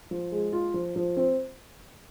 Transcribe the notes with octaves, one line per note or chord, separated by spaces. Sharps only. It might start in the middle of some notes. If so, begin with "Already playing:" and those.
F3
G#3
F4
F3
F3
C4